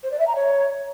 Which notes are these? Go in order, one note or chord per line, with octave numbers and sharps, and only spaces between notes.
C5
D5
E5
A#5
C#5